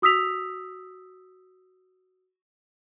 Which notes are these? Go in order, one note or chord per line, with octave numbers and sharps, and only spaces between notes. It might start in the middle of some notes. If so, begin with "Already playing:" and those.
F#4 D#6 E6 B6 F7